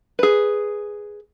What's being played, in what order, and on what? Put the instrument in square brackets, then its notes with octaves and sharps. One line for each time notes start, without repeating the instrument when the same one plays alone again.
[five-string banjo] G#4 B4